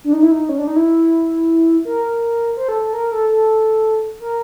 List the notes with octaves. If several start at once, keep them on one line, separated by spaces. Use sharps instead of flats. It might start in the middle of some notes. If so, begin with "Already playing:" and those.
D4
D#4
E4
D#4
C#4
D4
D#4
E4
A#4
C5
A4
A4
A#4
A4
A4
A#4